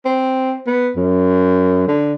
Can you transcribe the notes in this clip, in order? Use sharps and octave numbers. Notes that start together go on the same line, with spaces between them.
C4
B3
F#2
D3